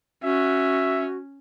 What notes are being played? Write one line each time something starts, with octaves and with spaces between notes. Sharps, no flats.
C#4 F#4 E5